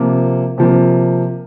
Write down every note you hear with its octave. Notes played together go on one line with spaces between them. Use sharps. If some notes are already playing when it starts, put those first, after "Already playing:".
Already playing: C3 F3 A#3
C3 F3 A#3